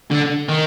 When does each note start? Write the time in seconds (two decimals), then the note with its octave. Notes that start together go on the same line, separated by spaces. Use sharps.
0.11 D3
0.49 D#3